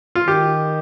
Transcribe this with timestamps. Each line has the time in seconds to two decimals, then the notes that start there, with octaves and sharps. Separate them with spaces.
0.15 F4
0.28 D#3 G4